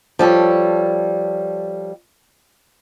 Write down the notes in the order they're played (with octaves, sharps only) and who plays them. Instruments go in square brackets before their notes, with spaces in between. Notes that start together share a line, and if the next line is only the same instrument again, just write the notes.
[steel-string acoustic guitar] F3 G3 A4 C#5